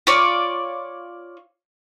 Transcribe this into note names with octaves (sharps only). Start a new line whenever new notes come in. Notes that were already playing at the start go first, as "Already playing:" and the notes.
F4 C#5 D5